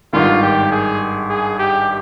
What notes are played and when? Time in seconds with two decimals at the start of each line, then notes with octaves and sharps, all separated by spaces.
0.13 G#1 G2 D#3 F4
0.42 G4
0.71 G#4
1.30 G#4
1.59 G4